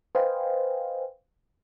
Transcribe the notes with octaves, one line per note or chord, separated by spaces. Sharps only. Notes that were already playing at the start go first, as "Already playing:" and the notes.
B4 C5 D#5 F5 G5 G#5